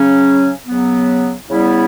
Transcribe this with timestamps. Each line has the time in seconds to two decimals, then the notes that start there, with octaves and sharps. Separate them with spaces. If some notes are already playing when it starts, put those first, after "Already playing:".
Already playing: C#3 F#3 C#4
0.67 C#3 F#3 B3
1.49 C#3 G3 B3 E4